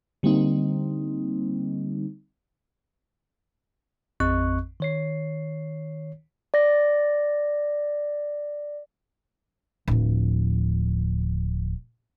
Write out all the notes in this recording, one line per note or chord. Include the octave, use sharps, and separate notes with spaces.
D3 G3 A#3 C4 D#4
A1 F2 C4 D#5 C#6 F#6
D#3 C#5 C7
D5 A#6
D1 F3